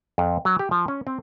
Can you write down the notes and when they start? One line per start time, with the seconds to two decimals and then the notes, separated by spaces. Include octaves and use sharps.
0.18 F2
0.45 F#3
0.59 G4
0.71 F3
0.88 C#4
1.07 C4